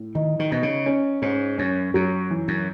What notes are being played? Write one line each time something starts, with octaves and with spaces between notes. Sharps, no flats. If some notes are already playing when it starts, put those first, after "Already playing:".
Already playing: A2
D#3 D#4
D#3
B2 D#4
C#3
C#4
G#2 C#4
F#2 C#4
F#2 F#3
E3
F#2